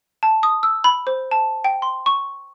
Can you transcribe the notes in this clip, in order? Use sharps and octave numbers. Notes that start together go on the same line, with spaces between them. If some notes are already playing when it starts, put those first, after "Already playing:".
A5
D#6
E6
B5
C5
A5
G5
C6
C#6